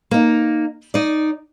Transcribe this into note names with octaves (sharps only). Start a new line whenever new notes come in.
A#3 D#4
D#4 D5